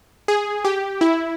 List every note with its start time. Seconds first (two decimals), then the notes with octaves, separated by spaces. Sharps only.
0.28 G#4
0.65 G4
1.01 E4